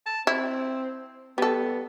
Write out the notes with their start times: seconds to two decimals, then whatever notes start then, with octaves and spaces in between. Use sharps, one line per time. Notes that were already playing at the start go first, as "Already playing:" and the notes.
0.06 A5
0.27 C4 E4
1.38 G3 B3 A4